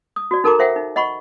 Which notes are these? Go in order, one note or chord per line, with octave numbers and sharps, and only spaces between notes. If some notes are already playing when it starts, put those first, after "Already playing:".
D#6
F#4 D5
D#4 A4 A#4 A5 A#5 D6
A#4 C5 E5 F#5 G5
D#4
D#5 F#5 B5 C#6